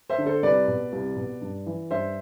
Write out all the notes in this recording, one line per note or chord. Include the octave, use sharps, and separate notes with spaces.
C5 E5
D3
A4 C5
C2 B4 D5
B2
C2
B2
G2
E3
G2 C5 E5